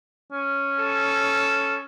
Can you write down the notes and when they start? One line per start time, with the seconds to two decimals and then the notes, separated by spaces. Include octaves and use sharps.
0.32 C#4
0.79 A4